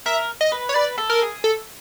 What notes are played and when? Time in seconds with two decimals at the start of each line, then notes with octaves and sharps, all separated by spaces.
0.06 A#4 E5
0.41 D#5
0.52 B4
0.69 C#5
0.74 B4 D5
0.98 A4
1.10 A#4
1.22 G#4
1.44 A4